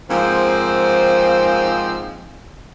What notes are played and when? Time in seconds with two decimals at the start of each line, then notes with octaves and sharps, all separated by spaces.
0.10 G#2 F3 A#3 C4